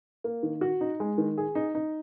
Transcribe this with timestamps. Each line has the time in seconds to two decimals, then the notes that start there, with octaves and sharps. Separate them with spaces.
0.24 A#3
0.43 D#3
0.61 F#4
0.81 D#4
1.00 G#3
1.18 D#3
1.38 G#4
1.55 D#4
1.75 D#4